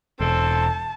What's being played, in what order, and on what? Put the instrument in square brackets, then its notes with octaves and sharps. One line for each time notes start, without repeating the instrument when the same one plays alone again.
[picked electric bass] E1 [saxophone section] C4 A4 [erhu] A5